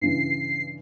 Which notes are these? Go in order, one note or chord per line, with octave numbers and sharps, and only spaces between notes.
G2 C#3 E3 C7